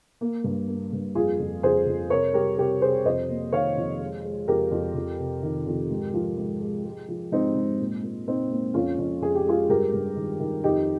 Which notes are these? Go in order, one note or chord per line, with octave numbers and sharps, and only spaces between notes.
A#3
G2
A#3
G2
F2 F4 G#4
F2
F2 G#4 C5
F2
C3 A#4 C#5
G3 G4 A#4
C3 G4 A#4
C3 G#4 C5
F2 C5 D#5
A#3
D#3 C#5 F5
F2
G#3
G#3
F2 G4 A#4
F2
F2
C3
D#3
F2
G#2
F3
G#2
G#3
G#3
F3
G#2 C4 D#4
G#2
A#2
A#2
A#2 C4 D#4
A#3
F2 C#4 F4
F2
F2 G#4
G4
G#3 F4 G#4
G2 G4 A#4
G2
D#3
D#3
F2 D#4 G4